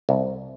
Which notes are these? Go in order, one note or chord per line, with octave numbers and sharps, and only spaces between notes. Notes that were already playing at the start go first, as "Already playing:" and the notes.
C2